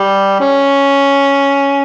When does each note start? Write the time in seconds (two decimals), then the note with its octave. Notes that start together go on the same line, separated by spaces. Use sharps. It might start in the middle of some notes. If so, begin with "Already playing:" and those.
Already playing: G3
0.40 C#4